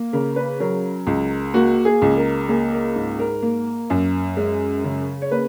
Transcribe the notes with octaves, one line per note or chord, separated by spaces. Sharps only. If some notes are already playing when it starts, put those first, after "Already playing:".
Already playing: A#3
C#3 A#4
B4
F#3 A#4
C#2
A#3 F#4
G#4
C#2
A#4
A#3 G#4
A#4
G#2
A#4
A#3
F#2
G#3
C#3
C#5
A#3 B4